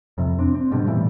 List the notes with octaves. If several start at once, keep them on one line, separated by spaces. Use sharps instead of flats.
F2 C3
C4 D4
C4
G#2 B2 D3 G3
A2 C#3 E3 G3